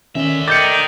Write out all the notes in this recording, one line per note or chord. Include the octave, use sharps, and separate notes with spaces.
D3 D#3 C#4 E5
D#3 D6 G6 A6 C#7